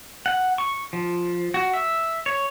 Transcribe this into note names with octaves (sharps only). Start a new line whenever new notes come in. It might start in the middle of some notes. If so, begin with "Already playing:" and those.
F#5
C#6
F3
F#4
E5
C#5